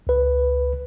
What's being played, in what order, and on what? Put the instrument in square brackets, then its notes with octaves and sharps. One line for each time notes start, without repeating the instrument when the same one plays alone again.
[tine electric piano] C#2 B4